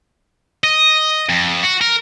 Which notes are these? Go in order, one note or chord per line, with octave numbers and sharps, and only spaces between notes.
D#5
F2
F#4
A#4